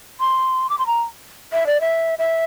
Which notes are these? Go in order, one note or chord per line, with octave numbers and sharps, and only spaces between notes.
C6
D6
C6
A#5
E5
D5
E5
E5